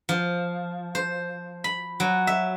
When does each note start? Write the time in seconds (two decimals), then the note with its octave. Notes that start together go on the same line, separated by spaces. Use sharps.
0.09 F3
0.95 C5
1.64 B5
2.00 F#3
2.27 E5